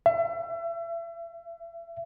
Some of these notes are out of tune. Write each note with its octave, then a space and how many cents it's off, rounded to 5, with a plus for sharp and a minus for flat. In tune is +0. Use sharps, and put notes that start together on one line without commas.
E5 +35